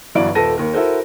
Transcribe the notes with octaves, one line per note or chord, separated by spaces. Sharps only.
G1 E3 F#3 D5 F5 D7
D#1 A4 B4 A5 A#6 D#7
D#2 A#4
E4 F#4 A4 A#4 C5